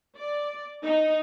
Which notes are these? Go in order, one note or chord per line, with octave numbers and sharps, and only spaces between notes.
D5
D#4